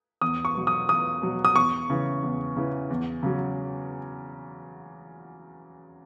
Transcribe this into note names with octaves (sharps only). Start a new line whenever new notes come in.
E2 D#6
C#6
B2 F#3
D#6
E2 D#6
B2 F#3
D#6
E2 C#6
C#3 E3
E2
C#3 E3
E2
C#3 F#3